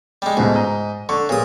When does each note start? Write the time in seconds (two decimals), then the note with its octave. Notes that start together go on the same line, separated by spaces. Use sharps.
0.22 G3 G#3
0.37 C#2 G#2 B2 A3
0.56 D#5 A#5
1.09 D3 C#6
1.29 A#2 G#3 B4 C#5 D#6